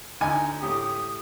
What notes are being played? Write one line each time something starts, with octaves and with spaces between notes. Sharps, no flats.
D2 D#4 G#5
A2 G4 D#6